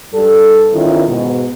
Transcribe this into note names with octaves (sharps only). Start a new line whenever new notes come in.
G2 G3 A4
E2 D#3 C#4 E4 F4
G#2 B2